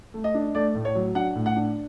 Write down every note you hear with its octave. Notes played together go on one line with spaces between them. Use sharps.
A3
D#5
D4
A3 D5
A2
C#5
F#3
D4 F#5
A2
F#5
D4